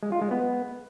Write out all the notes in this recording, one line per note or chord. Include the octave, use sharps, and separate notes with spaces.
G#3
F4
G#3
B3